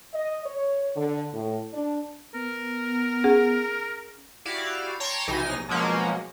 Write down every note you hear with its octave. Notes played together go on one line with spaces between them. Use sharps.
D#5
C#5
D3
A2
D4
B3 A#4
C#4 G#4 F#5
E4 F#4 G4 D5 F5
C#5 G5 A5 A#5 C6
B1 C3 E3 D#4 G#5 A#6
B2 F3 F#3 G#3 A#3 C#4